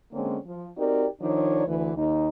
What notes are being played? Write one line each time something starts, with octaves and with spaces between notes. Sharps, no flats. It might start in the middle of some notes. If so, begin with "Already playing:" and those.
D3 G#3 A#3 C4 C#4
F3
C4 D#4 F#4 G4 A#4 D5
D#3 F3 D4 D#4 C#5 D5
D2 E3 B4
D#2 D#4